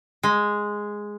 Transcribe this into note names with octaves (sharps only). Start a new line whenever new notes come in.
G#3